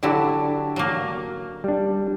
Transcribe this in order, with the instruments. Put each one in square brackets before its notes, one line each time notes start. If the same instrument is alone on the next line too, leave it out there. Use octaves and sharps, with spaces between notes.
[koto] D3 F#3 E4 [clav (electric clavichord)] D4 G4 D5
[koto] F#3 A#3
[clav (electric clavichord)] G3 D4